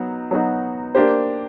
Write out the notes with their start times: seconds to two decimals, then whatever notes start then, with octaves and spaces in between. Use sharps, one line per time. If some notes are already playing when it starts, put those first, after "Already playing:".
Already playing: F#3 B3 D#4 F#4
0.31 F#3 B3 D#4 F#4
0.95 A#3 D4 G4 C5